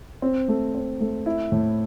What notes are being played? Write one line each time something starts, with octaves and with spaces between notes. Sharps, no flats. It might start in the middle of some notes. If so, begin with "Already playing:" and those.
C4
A3
C4
A3
E4
A2